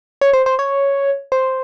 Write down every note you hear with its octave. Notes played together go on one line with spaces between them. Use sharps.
C#5
C5
C5
C#5
C5